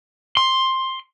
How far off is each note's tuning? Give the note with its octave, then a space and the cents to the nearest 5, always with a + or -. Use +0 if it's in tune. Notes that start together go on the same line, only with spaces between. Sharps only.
C6 +10